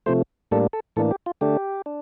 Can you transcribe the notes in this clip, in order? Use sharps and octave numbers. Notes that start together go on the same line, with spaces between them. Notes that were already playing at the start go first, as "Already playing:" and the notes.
C3 F3 A3 C5
A2 G3 A#3 D4 A4
A4
A2 E3 A#3 D4 A4
G4
F4
D3 A3 D4 G4
D4